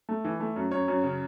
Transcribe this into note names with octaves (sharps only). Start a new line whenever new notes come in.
A3
E3
A3
F#2
F#2 C#5
F#2
C#3